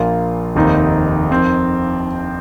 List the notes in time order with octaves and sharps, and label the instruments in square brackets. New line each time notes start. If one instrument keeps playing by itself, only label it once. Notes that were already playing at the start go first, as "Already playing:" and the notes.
Already playing: [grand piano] A#1 A#2 A#3 F4
F1 D#2 D#3 C4 D#4
F2 D#3 C4